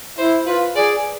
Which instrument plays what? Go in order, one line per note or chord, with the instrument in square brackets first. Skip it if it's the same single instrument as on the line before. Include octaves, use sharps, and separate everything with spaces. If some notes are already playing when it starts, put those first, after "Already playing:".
[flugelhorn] E4 [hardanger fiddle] C5
[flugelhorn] F4 [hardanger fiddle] B4
[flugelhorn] G#4 [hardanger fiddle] D5